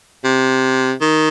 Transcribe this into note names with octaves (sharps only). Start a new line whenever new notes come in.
C3
D#3